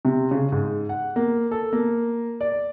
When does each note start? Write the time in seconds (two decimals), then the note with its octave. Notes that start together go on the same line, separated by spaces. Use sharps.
0.05 C3
0.31 C#3
0.52 G#2
0.89 F#5
1.16 A#3
1.51 A4
1.73 A#3
2.41 D5